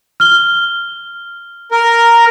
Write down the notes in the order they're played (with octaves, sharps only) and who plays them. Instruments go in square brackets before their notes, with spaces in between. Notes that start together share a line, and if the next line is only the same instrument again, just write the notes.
[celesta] F6 G7
[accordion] A#4